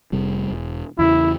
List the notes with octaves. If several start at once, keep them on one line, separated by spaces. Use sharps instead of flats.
F1 C3 G3
E1
E2 C#3 E3 E4